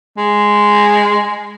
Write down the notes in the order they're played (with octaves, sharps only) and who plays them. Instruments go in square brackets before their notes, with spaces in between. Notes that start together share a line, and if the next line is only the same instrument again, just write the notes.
[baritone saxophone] G#3